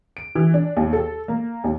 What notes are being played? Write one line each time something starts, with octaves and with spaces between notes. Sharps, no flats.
D7
E3
D4
D#2
A4
A#3
D#2